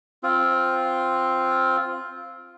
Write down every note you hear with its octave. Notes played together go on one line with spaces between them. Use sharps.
C4 F4